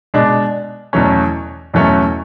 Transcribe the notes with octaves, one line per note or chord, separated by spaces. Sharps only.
B2 G#3 D4
E2 B2 F#3 A3 C#4
E2 B2 F#3 A3 C#4